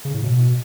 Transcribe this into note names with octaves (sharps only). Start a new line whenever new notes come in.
C#3
A2
B2